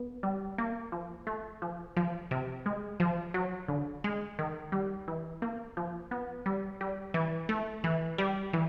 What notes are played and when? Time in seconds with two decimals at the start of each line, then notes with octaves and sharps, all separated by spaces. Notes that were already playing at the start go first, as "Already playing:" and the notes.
Already playing: B3
0.23 G3
0.58 A#3
0.92 F3
1.27 A3
1.62 F3
1.97 F3
2.31 C3
2.66 G#3
3.00 F3
3.34 F#3
3.68 D3
4.04 G#3
4.39 D#3
4.72 G3
5.08 E3
5.42 A#3
5.77 F3
6.11 B3
6.46 G3
6.81 G3
7.14 E3
7.49 A3
7.84 E3
8.18 G3
8.53 E3